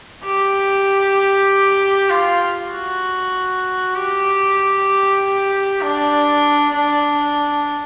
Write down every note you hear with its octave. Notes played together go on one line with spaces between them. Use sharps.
G4
F4
F#4
G4
D4
D4